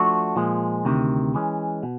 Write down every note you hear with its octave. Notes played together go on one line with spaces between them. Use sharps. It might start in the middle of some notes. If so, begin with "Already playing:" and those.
Already playing: F3 A3 D4 F#4
A#2 F3 G#3
D2 C3 D#3
E3 G#3 C#4
B2